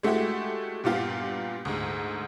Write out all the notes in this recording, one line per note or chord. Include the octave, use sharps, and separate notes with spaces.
G#3 A3 E4 F#4 G4
G2 A#2 B3 F4 G4
D2 G#2